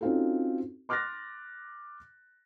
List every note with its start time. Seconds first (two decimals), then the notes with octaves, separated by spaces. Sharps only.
0.01 C4 C#4 D#4 F4 F#4 A4
0.89 C6 D6 F6 F#6 A6 A#6